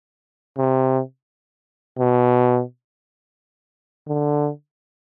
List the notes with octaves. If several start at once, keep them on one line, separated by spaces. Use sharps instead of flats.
C3
B2
D3